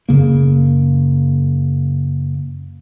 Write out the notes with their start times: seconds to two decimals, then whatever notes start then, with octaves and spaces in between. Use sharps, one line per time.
0.09 F#2 C#3 A#3